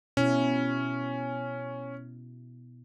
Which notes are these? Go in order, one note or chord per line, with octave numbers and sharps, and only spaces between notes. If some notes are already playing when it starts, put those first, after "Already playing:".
B2 C#4 E4